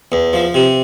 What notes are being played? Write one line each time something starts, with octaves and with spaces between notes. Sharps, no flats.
E2
F3
C3